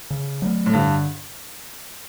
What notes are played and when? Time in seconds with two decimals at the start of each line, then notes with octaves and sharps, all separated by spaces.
0.10 C#3
0.42 F#3 A3
0.66 A2
0.73 G2 D3